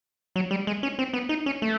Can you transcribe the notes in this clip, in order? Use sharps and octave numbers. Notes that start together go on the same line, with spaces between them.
F#3
G3
G#3
C#4
C4
B3
D#4
C#4
A3